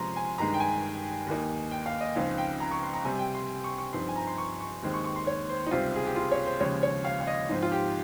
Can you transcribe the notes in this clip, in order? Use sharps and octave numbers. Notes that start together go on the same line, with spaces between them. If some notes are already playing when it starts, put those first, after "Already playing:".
Already playing: C3 F3 G#3 C#4 A#5 C6
G#5
G2 D#3 G#3 A#5
G5
G#5
D#2 D#3 A#3 D#4
G5
F5
D#5
C#2 C#3 F3 C4 D#4 F5
G5
A#5
C#6
C6
A#5
C3 G3 C4 G#5
G5
C6
C#6
C#6
G2 F3 C4 D#4 C6
G#5
A#5
C6
C#6
C#6
D#2 D#3 G#3 C4
C#6
C#6
C6
C#5
C5
D#4
C#2 C3 G3 C4 F4
G#4
G4
F4
C#5
C5
D#2 C#3 F3 G#3 C#5
C#5
F5
F5
D#5
G#2 F3 C4 D#4
F4
G4